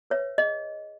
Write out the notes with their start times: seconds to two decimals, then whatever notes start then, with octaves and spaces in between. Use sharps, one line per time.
0.10 B4 C#5 E5
0.38 G#4 D#5